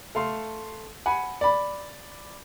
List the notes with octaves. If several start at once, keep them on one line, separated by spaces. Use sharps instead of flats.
A3 F5 C6
F#5 G#5 B5
D5 B5